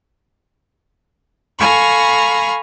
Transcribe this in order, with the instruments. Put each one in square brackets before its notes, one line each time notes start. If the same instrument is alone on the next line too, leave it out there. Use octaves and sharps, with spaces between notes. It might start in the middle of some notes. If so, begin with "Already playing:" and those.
[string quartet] A4 F5 G#5 A#5 B5 C#6